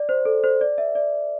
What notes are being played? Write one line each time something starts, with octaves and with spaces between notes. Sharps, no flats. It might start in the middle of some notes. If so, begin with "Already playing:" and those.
Already playing: D5
C5
A4
C5
D5
E5
D5